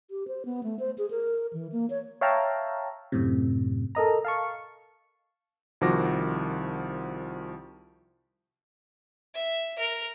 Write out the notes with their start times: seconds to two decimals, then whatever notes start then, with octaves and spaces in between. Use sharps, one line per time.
0.11 G4
0.28 C5
0.45 B3
0.63 A3
0.79 C5
0.98 G#4
1.11 A#4
1.53 E3
1.72 A#3
1.90 C#5
2.21 C#5 E5 F5 G5 A5 A#5
3.12 F#2 A2 C3
3.95 A4 A#4 D#5 A#5
4.25 F5 A5 C#6
5.81 C2 D#3 F3 F#4 D6 A#6
9.34 E5
9.79 A#4